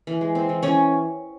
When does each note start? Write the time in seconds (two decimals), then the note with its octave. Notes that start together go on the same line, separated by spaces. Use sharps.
0.07 E3
0.21 G#3
0.35 C4
0.49 E3
0.63 E3 C#4 C#5